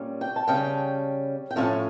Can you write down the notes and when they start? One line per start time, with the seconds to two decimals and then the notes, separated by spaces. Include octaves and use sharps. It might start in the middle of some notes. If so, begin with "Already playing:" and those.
Already playing: A#2 G3 C#4
0.21 G5
0.36 A5
0.48 C#3 G3 C#4 G5
1.51 G5
1.56 A2 F3 C#4 A5